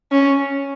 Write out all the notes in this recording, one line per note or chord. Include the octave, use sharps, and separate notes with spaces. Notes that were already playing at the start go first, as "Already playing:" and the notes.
C#4